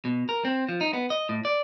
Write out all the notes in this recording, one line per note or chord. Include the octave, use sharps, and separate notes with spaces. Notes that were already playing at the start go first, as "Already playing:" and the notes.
B2
A#4
C4
F3
D#4
B3
D#5
A2
D5